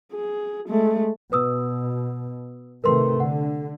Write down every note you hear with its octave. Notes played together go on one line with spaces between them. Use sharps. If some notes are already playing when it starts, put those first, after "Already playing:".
G#4
G#3 A3
B2 B4 D#6 E6
C3 D#3 A3 A#4 B4 C6
D3 F#5